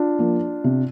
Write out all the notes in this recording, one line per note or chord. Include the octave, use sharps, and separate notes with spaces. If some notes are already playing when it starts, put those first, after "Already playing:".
Already playing: D4 F4
F3 A#3
C3